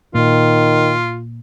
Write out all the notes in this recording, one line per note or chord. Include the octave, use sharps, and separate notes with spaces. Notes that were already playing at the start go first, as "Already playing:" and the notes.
A#2 D#3 F4